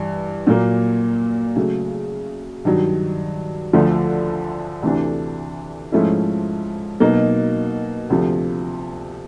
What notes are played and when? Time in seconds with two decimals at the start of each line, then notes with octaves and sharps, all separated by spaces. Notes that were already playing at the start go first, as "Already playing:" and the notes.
Already playing: G2 E3
0.47 A#2 F#3 A#3
1.56 C#3 F#3 A3
2.65 G2 D#3 F#3
3.73 D2 D3 F3 A3
4.82 D2 C3 E3 A3 D4
5.92 G#2 F3 A3 C#4 E4
7.00 B2 F#3 A#3 D#4
8.10 D2 C3 F3